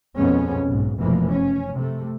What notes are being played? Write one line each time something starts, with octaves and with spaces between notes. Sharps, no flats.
B1 F2 F3 G#3 B3 C#4
B1 G#2
F1 F#2 B2 E3 F3 A#3
C#4
C3 A3